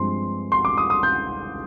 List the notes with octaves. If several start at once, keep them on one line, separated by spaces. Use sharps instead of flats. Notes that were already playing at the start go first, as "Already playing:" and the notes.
Already playing: G2 F3 G#3 C4 C6
C6
D6
D#6
D#6
G6